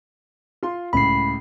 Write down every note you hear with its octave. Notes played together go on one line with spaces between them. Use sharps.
F4 C6
C#2 A2 C#3 B5 C7